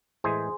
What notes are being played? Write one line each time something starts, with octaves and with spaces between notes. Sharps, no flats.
A2 E3 G#3 G#4 C5